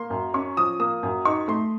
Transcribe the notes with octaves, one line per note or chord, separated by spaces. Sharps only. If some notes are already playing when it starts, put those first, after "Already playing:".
Already playing: A#3 C6
F#2
C#4 C#6
F3 D#6
A#3 D#6
F#2
D#4 C#6
A3 C6